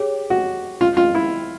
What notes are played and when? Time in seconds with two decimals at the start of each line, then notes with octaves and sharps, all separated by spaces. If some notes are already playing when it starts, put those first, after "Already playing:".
Already playing: G4 G#4 C#5
0.30 F#4
0.81 F4
0.97 F4
1.15 E4